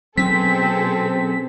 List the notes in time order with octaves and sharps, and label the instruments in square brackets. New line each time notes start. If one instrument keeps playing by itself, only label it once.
[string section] B2 G#4 A4 [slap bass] F#3 C#4 [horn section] C4 [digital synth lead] B6